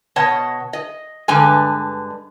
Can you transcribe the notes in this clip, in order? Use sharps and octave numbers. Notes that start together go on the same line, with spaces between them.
B2 C#5 D#5 F#5 A5
D#5
G2 D3 G#3 B4 G#5